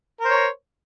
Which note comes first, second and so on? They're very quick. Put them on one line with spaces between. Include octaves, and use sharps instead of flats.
A#4 C5 C#5